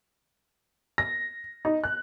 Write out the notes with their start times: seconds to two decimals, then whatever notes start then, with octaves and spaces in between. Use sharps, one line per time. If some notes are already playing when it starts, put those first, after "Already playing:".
0.98 A#6
1.65 D#4
1.84 F#6